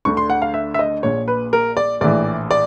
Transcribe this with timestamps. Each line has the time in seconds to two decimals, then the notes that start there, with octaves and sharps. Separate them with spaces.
0.05 D2 D3 C#6
0.17 C6
0.30 F#5
0.42 F5
0.54 E5
0.74 E5
0.79 D#5
1.03 A#1 A#2 C#5
1.28 B4
1.53 A#4
1.77 D5
2.01 A#1 A2 E3 D5
2.51 D5